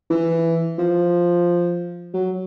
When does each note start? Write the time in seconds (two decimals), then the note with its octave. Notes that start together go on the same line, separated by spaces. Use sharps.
0.10 E3
0.79 F3
2.14 F#3